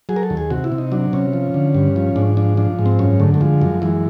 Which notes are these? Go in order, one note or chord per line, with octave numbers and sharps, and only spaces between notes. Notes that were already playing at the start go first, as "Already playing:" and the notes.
F#3 G#4
A#4
A4
D#2
G#4
C3 F#4
E4
C3
D#4
F#3 D4
C3 C#4
F3
D3
G2
F3
G#2 D4
F3 D4
F3 D4
G#2
C4
F#2 C#4
D3 A3
A3
F3 G#3
F#2
E3 G#3